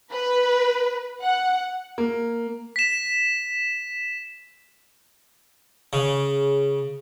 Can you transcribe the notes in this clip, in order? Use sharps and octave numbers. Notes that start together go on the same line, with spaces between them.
B4
F#5
A#3
B6 E7
C#3